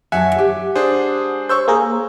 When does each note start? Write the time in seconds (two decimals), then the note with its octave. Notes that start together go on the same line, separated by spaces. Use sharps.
0.12 F#2 F#3 E5 F#5 G#5 A5
0.35 G#3 G4
0.75 D4 G#4 C5
1.49 C5 C#5 C#6 E6 G6
1.68 A#3 G#4 A#4